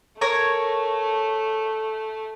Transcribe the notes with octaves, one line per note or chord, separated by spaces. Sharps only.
A3 A#4 C#5 A#5